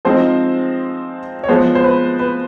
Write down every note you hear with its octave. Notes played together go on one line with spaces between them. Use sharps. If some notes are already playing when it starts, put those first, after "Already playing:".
F3 G#3 C4 D#4 C5
C#5
F3 G#3 B3 C5
C5
B4
B4